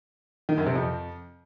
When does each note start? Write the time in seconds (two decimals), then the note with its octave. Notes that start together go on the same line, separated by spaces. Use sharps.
0.49 D#3
0.58 F#2
0.67 C3
0.75 F2